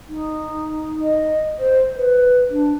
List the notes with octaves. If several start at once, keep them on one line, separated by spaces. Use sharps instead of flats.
D#4
D#5
C5
B4
D4